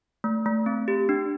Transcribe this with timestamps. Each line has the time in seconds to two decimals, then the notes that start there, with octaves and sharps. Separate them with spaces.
0.24 A3
0.46 A3
0.66 C4
0.88 G4
1.09 D4